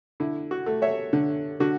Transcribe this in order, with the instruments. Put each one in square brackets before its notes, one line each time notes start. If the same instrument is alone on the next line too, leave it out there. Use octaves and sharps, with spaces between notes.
[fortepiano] D3 E4
F#4
A3
C#5 E5
D3
D3 F#4